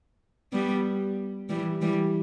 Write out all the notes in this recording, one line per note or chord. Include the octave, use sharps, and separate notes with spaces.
G3 B3
E3 G3
E3 G3